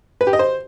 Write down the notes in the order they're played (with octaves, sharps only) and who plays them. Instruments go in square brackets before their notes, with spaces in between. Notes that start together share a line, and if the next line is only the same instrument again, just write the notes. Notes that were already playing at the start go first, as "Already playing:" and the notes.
[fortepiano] B4
G4
D#5
C5